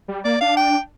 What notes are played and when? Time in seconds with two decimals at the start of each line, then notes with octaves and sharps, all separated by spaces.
0.08 G3
0.25 A#3 D5
0.41 D4 F5
0.57 G5